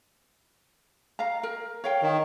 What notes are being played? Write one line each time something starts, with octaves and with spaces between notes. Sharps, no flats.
F5 A#5
A#4
C#5 F5 G5
D#3